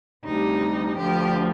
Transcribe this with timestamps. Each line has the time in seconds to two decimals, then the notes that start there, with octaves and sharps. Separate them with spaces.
0.25 D2 C3 G3 D#4
0.97 D2 D3 F3 G4